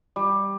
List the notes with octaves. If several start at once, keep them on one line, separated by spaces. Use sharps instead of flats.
G3